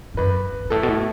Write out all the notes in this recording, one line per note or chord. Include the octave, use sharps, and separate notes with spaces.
G#2
F#2 B4
G#2
G#2
A2 A4
B2
A2